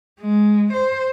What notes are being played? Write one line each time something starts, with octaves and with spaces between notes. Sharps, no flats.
G#3
C5